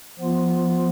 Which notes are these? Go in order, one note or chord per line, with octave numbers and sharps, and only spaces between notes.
F3 B3 F4